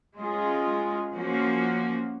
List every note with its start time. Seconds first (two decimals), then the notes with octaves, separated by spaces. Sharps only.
0.17 G#3 C#4 F4 G#4
1.13 F3 A#3 C#4 F#4